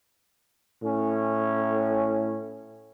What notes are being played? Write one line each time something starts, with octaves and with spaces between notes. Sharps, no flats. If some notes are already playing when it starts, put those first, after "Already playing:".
A2 C#4